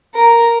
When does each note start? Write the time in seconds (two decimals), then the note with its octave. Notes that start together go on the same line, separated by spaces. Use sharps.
0.16 A#4